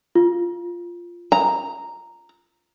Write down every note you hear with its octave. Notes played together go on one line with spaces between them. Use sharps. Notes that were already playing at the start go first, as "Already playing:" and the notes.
F4
A#5